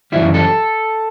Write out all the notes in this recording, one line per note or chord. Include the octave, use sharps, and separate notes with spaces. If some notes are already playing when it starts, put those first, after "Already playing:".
F#2 C#3 E3 G3 E4
A4